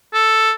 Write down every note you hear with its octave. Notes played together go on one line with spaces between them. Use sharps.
A4